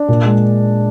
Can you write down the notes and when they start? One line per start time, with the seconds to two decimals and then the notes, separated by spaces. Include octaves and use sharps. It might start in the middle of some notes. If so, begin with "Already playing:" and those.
Already playing: D4 D5
0.08 A#2
0.24 G#3